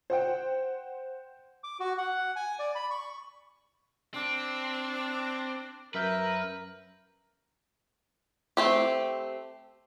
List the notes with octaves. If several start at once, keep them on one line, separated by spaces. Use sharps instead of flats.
C5 F#5 G5
D6
F#4
F#5
G#5
D5
B5
C#6
C4 D4
F#2 A#4 B4 E5 G6
A3 C4 G4